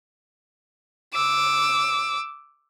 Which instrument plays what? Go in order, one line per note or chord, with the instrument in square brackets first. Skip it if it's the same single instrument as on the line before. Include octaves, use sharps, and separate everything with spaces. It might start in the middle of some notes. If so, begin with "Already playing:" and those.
[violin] D6 E6